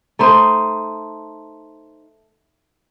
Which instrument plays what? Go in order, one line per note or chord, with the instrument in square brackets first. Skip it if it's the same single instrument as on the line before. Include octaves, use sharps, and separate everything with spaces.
[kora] A3 D#4 C5